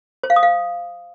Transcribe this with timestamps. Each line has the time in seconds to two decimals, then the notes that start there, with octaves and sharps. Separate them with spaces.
0.23 C5
0.30 F5
0.36 D#6
0.43 F5